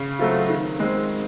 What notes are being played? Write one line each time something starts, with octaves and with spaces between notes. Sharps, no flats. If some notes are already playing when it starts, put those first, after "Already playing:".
Already playing: C#3
F#3 A3 C4 F4
D#3
G#3 C4